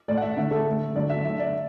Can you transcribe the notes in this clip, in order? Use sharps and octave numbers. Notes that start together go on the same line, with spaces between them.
A2 A3 D5
F#5
E5
D3 A3 E5
A4
D3 A3
D3 F#3 A3 D5
E5
D3 A3 E5
D5